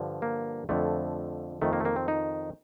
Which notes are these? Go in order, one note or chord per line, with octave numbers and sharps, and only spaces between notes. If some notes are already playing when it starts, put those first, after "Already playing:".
Already playing: G2 D3 F3
A#3
F2 D3 F3 A3
F2 D#3 A3
A#3
A3
A#3
C4
D#4